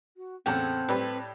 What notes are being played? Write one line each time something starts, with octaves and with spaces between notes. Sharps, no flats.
F#4
E2 A2 C#3 C4 A4 F#5 G5
A2 G3 G4 B4